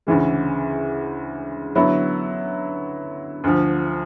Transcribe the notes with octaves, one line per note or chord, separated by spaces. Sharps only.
D2 C#3 E3 G#3
D3 F#3 B3 E4
D2 D3 F3